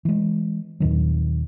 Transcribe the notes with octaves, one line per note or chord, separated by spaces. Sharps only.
E3 G#3
D#2 A#2 D#3 F#3